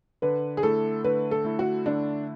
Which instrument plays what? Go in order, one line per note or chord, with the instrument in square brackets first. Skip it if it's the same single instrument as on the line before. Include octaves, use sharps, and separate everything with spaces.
[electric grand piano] D3 [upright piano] B4
[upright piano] G#4
[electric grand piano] A3 E4 [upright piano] A4
[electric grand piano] D3 [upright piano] B4
[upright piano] A4
[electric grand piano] A3 E4
[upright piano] F#4
[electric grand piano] D3 [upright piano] D4